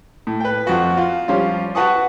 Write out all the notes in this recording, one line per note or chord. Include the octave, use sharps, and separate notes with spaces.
A2
B4 G5
F2 F#4
F4
F3 G3 C#4 F4
F#4 B4 F#5 A5 C#6 D#6